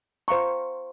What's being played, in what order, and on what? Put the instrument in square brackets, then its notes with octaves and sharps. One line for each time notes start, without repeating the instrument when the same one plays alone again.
[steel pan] C5 F5 A#5 C#6